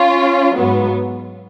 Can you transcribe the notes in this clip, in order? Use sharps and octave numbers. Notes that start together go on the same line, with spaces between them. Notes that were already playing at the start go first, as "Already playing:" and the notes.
Already playing: C#4 F4
G#2 F#3 B3